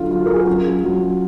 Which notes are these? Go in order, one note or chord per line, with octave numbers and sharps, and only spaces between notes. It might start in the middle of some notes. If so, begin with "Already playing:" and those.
Already playing: D3 F#3 F4
F#3 F4
A#4
G#4
F#4
F#2 F4
F#2 F#3 F#4